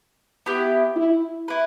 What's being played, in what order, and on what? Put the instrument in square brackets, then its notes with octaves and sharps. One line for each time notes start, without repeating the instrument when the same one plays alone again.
[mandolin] B3 E4 G4
[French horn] E4
[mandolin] E4 B4